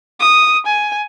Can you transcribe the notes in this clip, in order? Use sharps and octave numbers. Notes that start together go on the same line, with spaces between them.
D#6
G#5